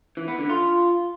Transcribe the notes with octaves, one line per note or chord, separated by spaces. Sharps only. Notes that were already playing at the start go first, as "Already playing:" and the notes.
E3
B3
D3
F4